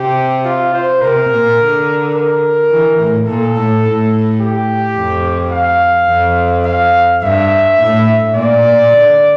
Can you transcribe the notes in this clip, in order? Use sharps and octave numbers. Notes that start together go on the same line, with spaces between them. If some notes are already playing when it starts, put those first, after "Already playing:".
Already playing: C3 G4
F4
C5
C3 A#4
A#2
D3
A#4
E3
A2
A#2 A4
A2
A2
G4
F2
F5
F2
F5
G2 E5
A2
A#2 D5
A#2
D3